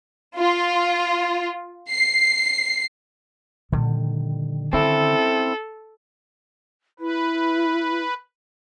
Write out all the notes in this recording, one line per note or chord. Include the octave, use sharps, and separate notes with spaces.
F4
C7
A#2 D3 D#3 F3 G3
C4 C#4 E4 A4
E4 B4